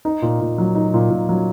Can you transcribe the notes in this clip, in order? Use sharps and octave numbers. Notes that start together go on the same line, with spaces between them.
D#4
A#2
A#2
F#3
D#4
A#2
A#2
F#3